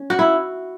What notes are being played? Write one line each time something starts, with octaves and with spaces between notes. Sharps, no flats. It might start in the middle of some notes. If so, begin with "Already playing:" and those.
Already playing: C#4
F#4
E4